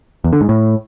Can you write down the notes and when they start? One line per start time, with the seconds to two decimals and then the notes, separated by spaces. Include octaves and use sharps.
0.24 E2
0.33 D3
0.41 G#2
0.49 A2